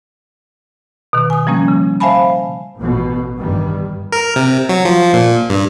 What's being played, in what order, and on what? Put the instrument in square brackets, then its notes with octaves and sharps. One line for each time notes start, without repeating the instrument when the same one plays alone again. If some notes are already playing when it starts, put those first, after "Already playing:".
[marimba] B2 D#3
G#5 D#6
F3 G3 A#3 C#4
C#3
C5 E5 F5 G#5 A5 B5
[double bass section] A1 B2
E2 G2 D#3 G3
[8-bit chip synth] A#4
C3
F#3
F3
A#2
G2